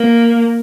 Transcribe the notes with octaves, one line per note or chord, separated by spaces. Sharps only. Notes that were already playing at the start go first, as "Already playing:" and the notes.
Already playing: A#3